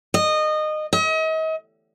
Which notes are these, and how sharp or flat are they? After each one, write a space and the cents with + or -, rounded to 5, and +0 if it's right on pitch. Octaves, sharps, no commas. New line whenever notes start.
D#5 -20
D#5 +40